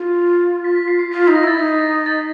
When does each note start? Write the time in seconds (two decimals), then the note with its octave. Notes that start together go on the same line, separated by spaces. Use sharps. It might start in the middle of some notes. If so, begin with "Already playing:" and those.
Already playing: F4
0.64 B6
0.76 B6
0.88 C7
0.99 C7
1.11 F4 B6
1.24 B6
1.28 D#4
1.35 A#6
1.43 E4 A6
1.58 D#4
2.06 A6